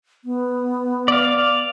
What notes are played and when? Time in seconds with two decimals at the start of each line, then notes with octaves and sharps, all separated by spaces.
0.25 B3
1.08 D5 F5